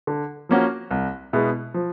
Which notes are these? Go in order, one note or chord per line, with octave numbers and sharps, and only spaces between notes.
D3
F3 A#3 C#4 F#4
C2
B2 G#3 B3 E4
F3